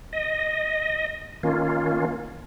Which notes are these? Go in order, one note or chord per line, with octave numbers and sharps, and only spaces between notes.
D#5
D#3 A#3 C#4 F4